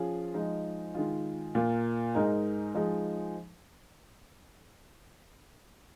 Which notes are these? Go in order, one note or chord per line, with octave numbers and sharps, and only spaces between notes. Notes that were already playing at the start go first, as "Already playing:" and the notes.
Already playing: F3 C#4 F4 G#4
F3 G#3 D#4
D#3 G#3 F4
A#2 A#3 F4
G#2 G#3 D#4 A#4
F3 G#3 D#4 G#4